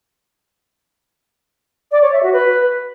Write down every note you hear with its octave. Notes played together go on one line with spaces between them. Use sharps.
D5
C#5
E5
F#4
B4